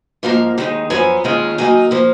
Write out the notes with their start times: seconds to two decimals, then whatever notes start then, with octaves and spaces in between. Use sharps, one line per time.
0.23 G#2 F3 A#3 F5
0.58 D#2 D#3 G#3 D#4
0.90 F#2 F3 B3 G#5
1.24 D#2 D#3 G#3 C#4 F4
1.58 D#3 F#3 A#3 D#4 G#5
1.91 F3 A#3